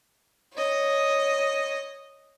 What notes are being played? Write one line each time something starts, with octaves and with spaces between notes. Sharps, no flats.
C#5 D#5